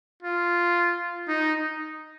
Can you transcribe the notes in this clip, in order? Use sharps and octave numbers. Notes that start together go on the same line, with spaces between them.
F4
D#4